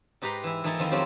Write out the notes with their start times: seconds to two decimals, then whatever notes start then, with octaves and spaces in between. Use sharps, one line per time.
0.22 G#2 D#4 G4 B4 A#5 C6
0.44 E3 E4
0.64 E3 F3 A#3 D#4 E4 A4
0.79 F2 D#3 F3 E4 C6
0.91 F3 F#3 A3 C4 C#4 G4